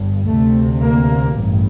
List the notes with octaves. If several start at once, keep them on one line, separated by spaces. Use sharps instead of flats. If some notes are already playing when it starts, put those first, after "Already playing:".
Already playing: G1 G2
D2 C3 A3
A#3
A1 G2